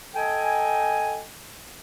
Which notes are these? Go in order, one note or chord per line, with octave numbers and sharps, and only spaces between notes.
A4 D#5 G5 G#5